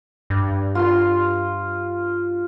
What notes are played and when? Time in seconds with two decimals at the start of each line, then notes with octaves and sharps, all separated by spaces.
0.30 G2
0.75 F4 C6